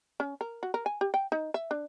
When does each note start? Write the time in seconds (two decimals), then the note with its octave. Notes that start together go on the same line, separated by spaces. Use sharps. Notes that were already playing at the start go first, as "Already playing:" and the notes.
0.20 C#4
0.41 A#4
0.63 F#4
0.74 A#4
0.86 G#5
1.01 G4
1.14 G5
1.32 D#4
1.54 E5
1.71 D4